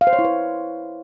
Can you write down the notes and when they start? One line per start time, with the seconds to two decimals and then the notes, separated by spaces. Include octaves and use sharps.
0.01 F5
0.07 C5
0.13 C#5
0.19 E4
0.25 B4